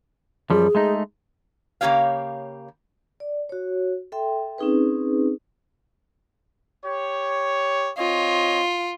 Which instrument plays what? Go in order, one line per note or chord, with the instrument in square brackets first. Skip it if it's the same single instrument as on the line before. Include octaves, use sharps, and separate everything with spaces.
[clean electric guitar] F#2 F3 G3 [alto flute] G#4
[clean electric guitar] G#3 A3 D#4
[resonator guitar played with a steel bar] C#3 A#3 G4 C#5 F5
[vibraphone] D5
F#4 C#5
A4 E5 G5 C6
C4 C#4 D#4 G#4 B4
[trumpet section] G4 C#5
[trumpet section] C4 C#5 D#5 [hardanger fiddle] F4